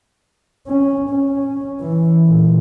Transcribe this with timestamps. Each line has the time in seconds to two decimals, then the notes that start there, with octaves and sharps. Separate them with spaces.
0.67 C#4
1.10 C#4
1.80 E3
2.26 A#2